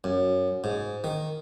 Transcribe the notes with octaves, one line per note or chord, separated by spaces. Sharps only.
F#2
G#2
D#3